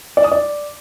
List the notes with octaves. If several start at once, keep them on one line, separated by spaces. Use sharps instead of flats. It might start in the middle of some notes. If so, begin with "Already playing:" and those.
D5
D#6
D5